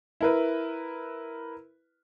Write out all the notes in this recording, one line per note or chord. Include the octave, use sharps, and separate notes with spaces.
E4 A#4 B4